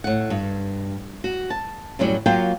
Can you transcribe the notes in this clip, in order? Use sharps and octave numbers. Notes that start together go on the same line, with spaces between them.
A2 F#5
G2
F#4
A5
F#2 A2 F#3 G3
F#3 A#3 F4 G5